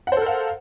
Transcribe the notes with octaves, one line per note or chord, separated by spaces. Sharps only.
A4 A#4 C5 F5 F#5